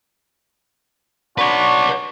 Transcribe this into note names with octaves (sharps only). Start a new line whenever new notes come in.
D4 F#4 B4 C#5